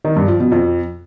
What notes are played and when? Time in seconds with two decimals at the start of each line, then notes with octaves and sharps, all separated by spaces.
0.04 D#3
0.16 G2
0.28 F3
0.40 B2
0.52 F2